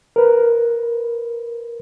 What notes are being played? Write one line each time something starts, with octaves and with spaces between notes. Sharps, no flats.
A#4 B4